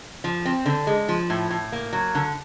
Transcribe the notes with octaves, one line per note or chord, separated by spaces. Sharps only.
F3
C4
D3
G#3
F3
A2
A2
A#3
F#3
D3